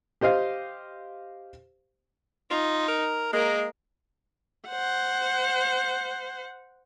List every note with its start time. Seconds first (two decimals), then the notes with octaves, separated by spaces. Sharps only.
0.21 G4 C5 D#5 F5
2.51 D#4 F4
2.88 A#4
3.33 G#3 A#3 A#4
4.69 C5 F#5